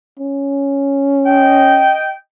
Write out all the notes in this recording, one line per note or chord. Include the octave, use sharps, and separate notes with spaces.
C#4
D#5 G5